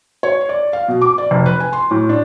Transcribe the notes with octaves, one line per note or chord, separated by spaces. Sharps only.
C#5
D5
F5
B2
D6
D5
F1
B4
G#5
C6
A2
D4